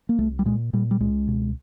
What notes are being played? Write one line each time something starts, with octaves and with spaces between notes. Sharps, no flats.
A#3
C2 A3
G3
A#2 G#3
A#2 G3
G3
C#2 G#3
B2